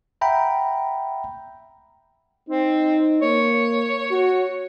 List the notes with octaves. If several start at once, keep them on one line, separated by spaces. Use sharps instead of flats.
E5 F#5 G5 A#5 B5
C4 D#4
A#3 C#5
F#4